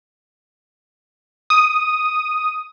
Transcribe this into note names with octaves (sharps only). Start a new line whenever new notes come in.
D#6